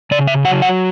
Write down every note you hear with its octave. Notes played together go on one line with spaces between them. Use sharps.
C#3 D5
E5
F#3 F#5
F#5